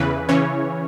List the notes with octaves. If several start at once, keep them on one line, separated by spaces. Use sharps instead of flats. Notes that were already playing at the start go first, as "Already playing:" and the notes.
Already playing: E2 C#3 E3 B4
C#3 E3 C#4 C#5